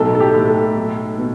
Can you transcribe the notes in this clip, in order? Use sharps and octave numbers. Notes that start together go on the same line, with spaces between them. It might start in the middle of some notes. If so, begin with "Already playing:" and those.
Already playing: B1 A2 A4
A4
G4
A2
A4
B1
B2